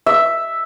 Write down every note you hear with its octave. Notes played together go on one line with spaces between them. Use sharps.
E5